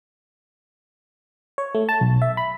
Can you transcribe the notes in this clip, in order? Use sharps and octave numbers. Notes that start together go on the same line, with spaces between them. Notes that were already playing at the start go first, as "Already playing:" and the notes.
C#5
A3
A5
B1
E5
B5